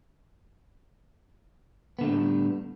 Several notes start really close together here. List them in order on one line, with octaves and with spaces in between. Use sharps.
B3 D3 A3 A2 G3